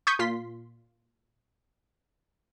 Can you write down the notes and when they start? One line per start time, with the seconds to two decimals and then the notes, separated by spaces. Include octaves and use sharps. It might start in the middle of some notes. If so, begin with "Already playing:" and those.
0.07 C#6 D#6 G6 G#6 B6 D#7
0.19 A#2 F4 C6 B6